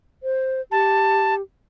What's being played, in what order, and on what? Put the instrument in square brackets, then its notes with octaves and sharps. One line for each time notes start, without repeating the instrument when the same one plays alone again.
[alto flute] C5
[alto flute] G4 [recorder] A5